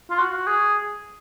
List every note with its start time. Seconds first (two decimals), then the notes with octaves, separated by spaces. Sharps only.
0.10 F4
0.19 F#4
0.47 G#4